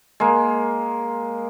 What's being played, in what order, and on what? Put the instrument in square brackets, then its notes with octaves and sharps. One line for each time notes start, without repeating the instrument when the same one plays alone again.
[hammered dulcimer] G#3 A#3